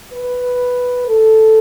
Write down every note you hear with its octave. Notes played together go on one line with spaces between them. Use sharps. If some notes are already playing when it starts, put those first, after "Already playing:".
B4
A4